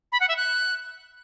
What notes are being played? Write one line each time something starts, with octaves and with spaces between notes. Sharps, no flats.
B5
F#5
E5
F#6